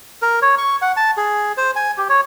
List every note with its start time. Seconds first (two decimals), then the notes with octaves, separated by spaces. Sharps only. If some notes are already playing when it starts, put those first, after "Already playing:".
0.22 A#4
0.42 C#5
0.58 C#6
0.82 F#5
0.96 A5
1.17 G#4
1.57 C5
1.76 G#5
1.98 G4
2.10 C#5